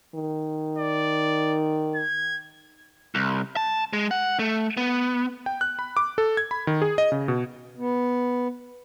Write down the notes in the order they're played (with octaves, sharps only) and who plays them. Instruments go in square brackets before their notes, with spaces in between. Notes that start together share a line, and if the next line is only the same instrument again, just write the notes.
[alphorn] D#3
[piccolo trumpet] D5
G#6
[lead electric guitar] C2
A5
G#3
F#5
A3
B3
[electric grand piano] G5
F#6
B5
D6
A4
G#6
B5
D#3
G#4
D#5
C#3
B2
[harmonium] B3